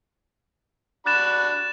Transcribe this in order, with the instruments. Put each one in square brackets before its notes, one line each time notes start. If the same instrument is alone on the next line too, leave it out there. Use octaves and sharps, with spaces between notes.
[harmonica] D4 F#4 B5 [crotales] F#6 A6 E7